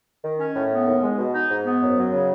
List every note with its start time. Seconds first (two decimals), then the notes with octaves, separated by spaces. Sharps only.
0.23 D#3
0.38 C#4
0.54 A2
0.71 B3
0.86 D#2
1.01 G#3
1.17 B2
1.33 D#4
1.49 G#2
1.65 B3
1.80 F#2
1.97 F#3
2.12 C#3